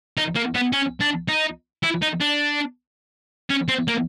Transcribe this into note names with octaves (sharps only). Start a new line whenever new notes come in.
D#4
A#3
B3
C#4
D4
D#4
E4
D#4
D4
C#4
C4
A#3